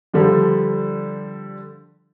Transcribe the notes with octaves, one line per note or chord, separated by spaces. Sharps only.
D3 F3 G3 D4